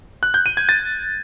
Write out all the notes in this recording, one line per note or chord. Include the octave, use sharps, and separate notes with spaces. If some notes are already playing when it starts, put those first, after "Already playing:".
F#6
G6
D#7
G#6
A6